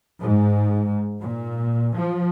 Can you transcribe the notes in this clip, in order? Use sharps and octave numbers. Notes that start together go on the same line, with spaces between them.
G#2
A#2
F3